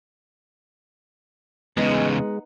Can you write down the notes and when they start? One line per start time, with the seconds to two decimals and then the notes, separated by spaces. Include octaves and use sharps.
1.77 E2 C#3 G#3 B3 D#4